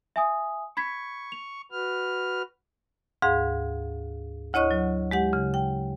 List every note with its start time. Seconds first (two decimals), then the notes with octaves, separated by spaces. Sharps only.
0.16 E5 G#5 D#6
0.77 B5 C#6 G#6 B6
1.32 F7
1.72 F#4 B4 F6
3.22 D2 G#2 G#4 F5
4.53 D2 E4 C#5 D#5 C#6 F#6
4.71 F#3
5.11 G#3 G4 F#5
5.33 C#3
5.54 G5